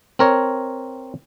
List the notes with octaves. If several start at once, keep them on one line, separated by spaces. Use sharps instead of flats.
C4 A#4 C#5